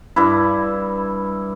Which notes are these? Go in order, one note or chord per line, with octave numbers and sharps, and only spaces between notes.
G2 E4